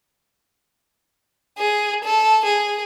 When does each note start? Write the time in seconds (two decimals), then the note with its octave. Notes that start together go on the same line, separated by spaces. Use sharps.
1.58 G#4
2.04 A4
2.45 G#4